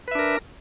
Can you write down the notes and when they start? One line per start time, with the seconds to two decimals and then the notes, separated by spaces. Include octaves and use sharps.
0.08 B4
0.11 E5
0.15 D4
0.19 A#4